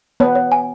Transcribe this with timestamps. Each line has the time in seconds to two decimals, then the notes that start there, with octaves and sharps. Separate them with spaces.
0.20 B3 C#5
0.35 C#5
0.52 G#5